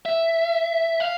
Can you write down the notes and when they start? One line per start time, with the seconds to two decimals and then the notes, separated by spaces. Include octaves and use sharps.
0.06 E5
1.00 F5